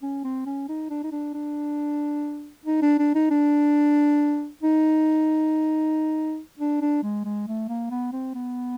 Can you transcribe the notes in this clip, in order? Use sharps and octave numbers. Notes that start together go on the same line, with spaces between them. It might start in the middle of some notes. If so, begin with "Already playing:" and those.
C#4
C4
C#4
D#4
D4
D#4
D4
D4
D#4
D4
D4
D#4
D4
D#4
D4
D4
G#3
G#3
A3
A#3
B3
C4
B3